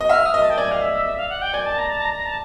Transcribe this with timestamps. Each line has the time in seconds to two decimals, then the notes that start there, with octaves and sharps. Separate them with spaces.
0.01 D#5
0.09 E5 F6
0.26 D#6
0.34 D#5
0.42 A5
0.50 G5
0.58 D5 G#5
0.71 F5
0.82 E5
0.93 E5
1.06 E5
1.17 F5
1.30 F#5
1.42 G5
1.54 D5 G#5
1.66 A5
1.78 A#5
1.90 A5
2.02 A#5
2.14 A#5
2.25 A5